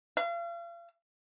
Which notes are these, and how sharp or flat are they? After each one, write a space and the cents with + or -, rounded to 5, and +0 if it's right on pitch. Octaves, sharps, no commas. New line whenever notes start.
F5 -40